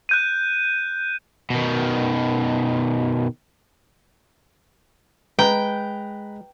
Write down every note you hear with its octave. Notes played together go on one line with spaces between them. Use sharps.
F#6 G6 D#7
B2 D#3
G#3 B4 G5 A#5